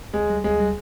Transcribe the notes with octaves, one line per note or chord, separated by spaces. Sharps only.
D2 G#3
G3
D2 G#3
G3